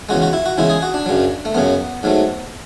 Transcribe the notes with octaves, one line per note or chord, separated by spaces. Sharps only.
E2 C#3 G#3 F#4
F#4
E4
F#4
E2 C#3 G#3 E4
G#4
F#4
D4
F#2 C#3 F#3
A3
F#2 C#3 F#3 B3
G#2 F#3 A3